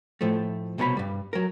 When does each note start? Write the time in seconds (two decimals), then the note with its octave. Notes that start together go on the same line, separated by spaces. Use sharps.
0.21 A2 F3 A3
0.78 C2 B2 C#5 A#5 B5
0.97 G2 G3
1.33 F#3 A#4